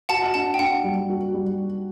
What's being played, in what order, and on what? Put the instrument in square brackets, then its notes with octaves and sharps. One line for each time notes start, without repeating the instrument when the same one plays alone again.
[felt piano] F#4 [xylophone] F#5 A5
[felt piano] D4 [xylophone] F#5 A5
[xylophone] G5
[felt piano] D4 [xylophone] F#5
[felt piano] G3
F#4
G3